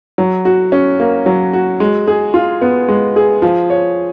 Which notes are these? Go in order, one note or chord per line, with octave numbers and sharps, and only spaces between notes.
F#3
F#4
C#4
A#3
F#3
F#4
G#3
G#4
F4
B3
G#3
G#4
F3
C#5